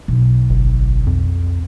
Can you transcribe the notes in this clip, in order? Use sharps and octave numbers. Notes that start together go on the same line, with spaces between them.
B1
G1
F2